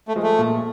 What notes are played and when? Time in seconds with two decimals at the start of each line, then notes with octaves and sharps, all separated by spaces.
0.08 A3
0.16 F3 G#3
0.23 A3
0.39 A#2